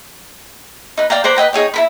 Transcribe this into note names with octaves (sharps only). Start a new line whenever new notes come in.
D#4 B4
D5 F5 G5 A#5
B4 C5 D5 A#5
B4 D#5 G5 A#5
D#4 G#4 C#5 G5
E4 A#4 B5